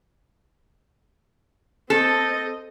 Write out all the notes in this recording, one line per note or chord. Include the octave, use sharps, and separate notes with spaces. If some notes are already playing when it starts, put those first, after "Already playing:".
C4 A4 D#5